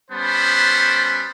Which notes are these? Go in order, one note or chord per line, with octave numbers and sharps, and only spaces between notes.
G3 B3 C#4 C5 A5 B5